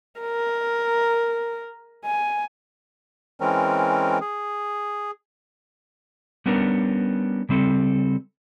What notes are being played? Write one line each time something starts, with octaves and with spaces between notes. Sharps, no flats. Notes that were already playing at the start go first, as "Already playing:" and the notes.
A#4
G#5
E3 G#3 C4 C#4 A#4
G#4
G3 B3 C#4 D4 A#4
C#3 G3 C4 A4